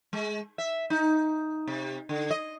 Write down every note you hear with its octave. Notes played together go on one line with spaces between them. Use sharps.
G#3
E5
D#4
C3
D3
D#5